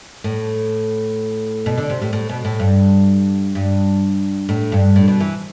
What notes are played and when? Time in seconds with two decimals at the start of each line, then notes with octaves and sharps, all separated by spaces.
0.24 A2
1.66 B2
1.78 D3
1.90 C3
2.02 A2
2.13 A2
2.29 B2
2.45 A2
2.60 G2
3.55 G2
4.49 A2
4.72 G2
4.96 A2
5.08 B2
5.20 E3